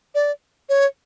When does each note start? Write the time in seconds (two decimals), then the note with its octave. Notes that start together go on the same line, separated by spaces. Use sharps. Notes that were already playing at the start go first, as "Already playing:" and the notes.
0.15 D5
0.69 C#5